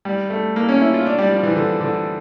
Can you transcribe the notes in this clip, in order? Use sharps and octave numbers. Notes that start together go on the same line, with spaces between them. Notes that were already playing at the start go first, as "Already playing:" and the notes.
G3
A3
A#3
C#4
E4
F4
D4
G3
F3
E3
D3
D3